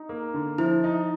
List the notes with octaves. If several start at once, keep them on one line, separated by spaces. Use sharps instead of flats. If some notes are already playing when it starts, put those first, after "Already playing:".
Already playing: D#4
A#3
D3
F3 E4
D#4